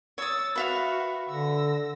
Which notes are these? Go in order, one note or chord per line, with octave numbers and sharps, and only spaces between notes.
C#5 D#6 E6 A6
F#4 B4 E5 F5
D3 E6 A#6